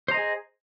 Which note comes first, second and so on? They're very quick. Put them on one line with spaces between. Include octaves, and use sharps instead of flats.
C5 A#5 D#5 G#4